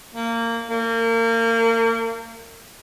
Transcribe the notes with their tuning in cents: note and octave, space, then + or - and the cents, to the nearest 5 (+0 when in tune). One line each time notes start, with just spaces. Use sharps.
A#3 -20
A#3 -35